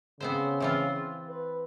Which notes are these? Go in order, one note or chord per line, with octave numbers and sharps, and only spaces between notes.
C#3 B3 C4 C5
E3 C4 F4
B4